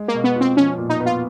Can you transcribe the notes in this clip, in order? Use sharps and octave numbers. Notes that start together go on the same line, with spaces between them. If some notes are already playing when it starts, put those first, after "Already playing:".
Already playing: G#3
A#3
B2
B3
C4 F4
F3 C#4
A#2
D#4
B3
F4